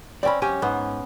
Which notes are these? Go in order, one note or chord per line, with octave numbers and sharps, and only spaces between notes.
C4 C#4 D5 G5 B5
F#2 C#4 G4 G#5
G#2 B3